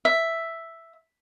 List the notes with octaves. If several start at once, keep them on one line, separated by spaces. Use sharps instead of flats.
E5